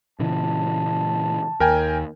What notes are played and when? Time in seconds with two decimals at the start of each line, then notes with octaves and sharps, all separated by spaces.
0.20 A#2 C#3 E3 A5
1.60 D#2 A#4 G5 G#5